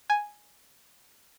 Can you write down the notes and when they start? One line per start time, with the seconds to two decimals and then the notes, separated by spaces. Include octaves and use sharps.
0.10 G#5